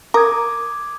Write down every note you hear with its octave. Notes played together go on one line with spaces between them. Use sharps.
A#4 D6 D#6 G#6